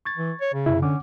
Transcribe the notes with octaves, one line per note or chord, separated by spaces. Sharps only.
C#6 G#6 A6
E3
C#5
C#3
F#2 C3 E4
D3 C#4 F#5 D6